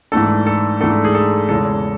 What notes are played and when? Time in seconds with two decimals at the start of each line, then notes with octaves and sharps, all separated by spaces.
0.12 G#2 E3 A3 D4 A4
0.47 A4
0.81 G#2 E3 A3 D4 A4
1.04 G#4
1.15 A4
1.49 E2 C#3 E3 G#3 A4